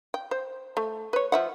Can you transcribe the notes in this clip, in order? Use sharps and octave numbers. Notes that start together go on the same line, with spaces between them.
G5
C5
A3
B4 C#5
F3 E5 F#5